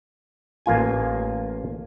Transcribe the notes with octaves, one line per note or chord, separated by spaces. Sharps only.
A1 A#3 F4 G#5